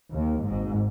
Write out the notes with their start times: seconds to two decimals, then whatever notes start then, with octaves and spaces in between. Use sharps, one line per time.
0.12 D#2
0.45 G#1 G#2